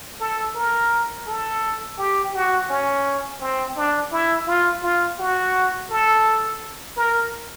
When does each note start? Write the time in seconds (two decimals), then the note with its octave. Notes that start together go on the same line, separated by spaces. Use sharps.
0.20 A4
0.55 A#4
1.27 A4
1.98 G4
2.34 F#4
2.69 C#4
3.40 C4
3.77 D4
4.12 E4
4.47 F4
4.83 F4
5.19 F#4
5.90 A4
6.96 A#4